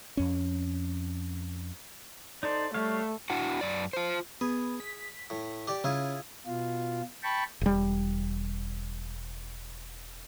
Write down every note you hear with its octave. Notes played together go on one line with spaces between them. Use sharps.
F2 C#4
D#4 A4 C5 D5
G3 A3 C#5 F5
D4 E4 F#4 F#5
F#2 D5
F4 C5
B3 G#4
B6
A2
G4 D5 G5
C#3 E4 F4 G#4
B2 F4
G5 A5 B5 C#6
E1 G3